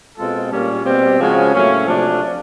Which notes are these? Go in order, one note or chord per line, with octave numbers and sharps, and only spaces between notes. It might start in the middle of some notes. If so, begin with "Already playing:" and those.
B2 G#3 C4 F4 A4
A#2 G3 A#3 C#4
B2 G3 C4
C#3 F3 G#3 C#4 F#4
A2 F#3 A#3 C#4
C3 F3 A3 D4